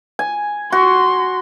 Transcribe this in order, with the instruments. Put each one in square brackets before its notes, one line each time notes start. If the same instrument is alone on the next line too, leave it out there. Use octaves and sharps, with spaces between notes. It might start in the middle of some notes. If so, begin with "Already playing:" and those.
[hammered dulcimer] G#5
[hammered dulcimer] F#4 [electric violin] C6